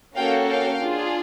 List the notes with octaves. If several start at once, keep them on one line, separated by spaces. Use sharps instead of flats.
A#3 C#4 F#4 A4 F5 G5
F5 G5
D4 F4 G#4